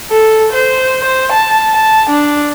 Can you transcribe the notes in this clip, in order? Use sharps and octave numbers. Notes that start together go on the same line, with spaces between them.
A4
C5
C5
A5
A5
D4